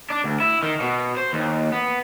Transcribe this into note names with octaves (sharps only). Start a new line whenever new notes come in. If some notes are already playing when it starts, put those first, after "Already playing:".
D4
D2
E4
D#3
B2
C5
D#2
B3